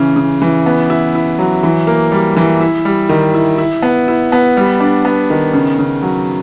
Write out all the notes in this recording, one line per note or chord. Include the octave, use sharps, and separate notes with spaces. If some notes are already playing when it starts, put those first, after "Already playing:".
Already playing: C#3 E3
C#3
E3
B3
E4
E4
F#3
E3
A#3
G3
E3
E4
G3
D#3
E4
E4
B3
E4
B3
G3
D4
B3
D#3
C#3
C#3
F#3